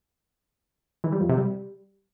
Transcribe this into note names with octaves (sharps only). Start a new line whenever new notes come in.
E3
G3
F2
C3
G3